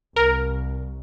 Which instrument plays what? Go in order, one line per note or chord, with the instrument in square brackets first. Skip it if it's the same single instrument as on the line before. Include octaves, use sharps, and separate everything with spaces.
[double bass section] C2 [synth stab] A#4